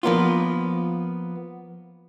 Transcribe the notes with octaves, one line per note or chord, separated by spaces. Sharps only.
F3 A#3 B3 F4